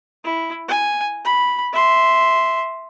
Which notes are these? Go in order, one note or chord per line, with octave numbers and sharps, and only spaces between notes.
E4
G#5
B5
E5 C6